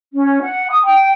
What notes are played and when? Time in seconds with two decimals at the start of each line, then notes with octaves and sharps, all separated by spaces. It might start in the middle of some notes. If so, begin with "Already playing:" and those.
0.14 C#4
0.41 F#5
0.69 D#6
0.84 G5